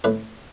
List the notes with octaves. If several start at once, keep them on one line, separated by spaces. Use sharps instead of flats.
A2 B4